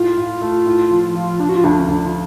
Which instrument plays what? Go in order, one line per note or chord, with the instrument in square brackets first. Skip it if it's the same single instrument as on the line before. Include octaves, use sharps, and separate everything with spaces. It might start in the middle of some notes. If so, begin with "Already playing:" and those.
Already playing: [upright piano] A2 [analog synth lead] F4
[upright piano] A2
A3
A2
F3
F3
[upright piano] F3 [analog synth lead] D4
[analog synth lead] F#4
F4
[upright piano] D2 [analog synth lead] D4
[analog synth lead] C#4
[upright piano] D2 [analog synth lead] D4
[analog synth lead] F4